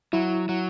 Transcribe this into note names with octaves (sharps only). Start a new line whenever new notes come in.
F#3 E4
F#3